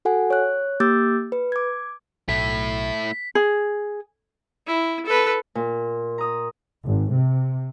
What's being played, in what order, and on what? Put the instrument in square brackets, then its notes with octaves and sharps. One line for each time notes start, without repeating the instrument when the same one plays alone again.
[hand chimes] F#4 A4 F#5 G#5
C#5 F#6
A#3 G4 D6 E6 G6 A6
B4
D6 G#6
[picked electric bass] B1 [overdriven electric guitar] A3 E4 [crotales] B6
[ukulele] G#4
[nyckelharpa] E4
A4 B4
[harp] A#2
A#5 D#6
[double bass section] G#1
C3